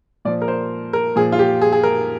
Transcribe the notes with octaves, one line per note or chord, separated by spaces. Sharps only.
A#2 F3 D5
A#4
C5
A#4
A#2 F3 G#4
F4
G4
G#4
G#4
A#4